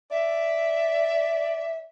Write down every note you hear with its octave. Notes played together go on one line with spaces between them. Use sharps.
D5 E5